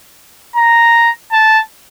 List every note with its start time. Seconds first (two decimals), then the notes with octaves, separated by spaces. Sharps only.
0.56 A#5
1.32 A5